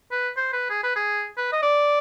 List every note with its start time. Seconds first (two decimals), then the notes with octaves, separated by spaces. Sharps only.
0.11 B4
0.37 C5
0.53 B4
0.70 G#4
0.83 B4
0.96 G#4
1.37 B4
1.52 D#5
1.62 D5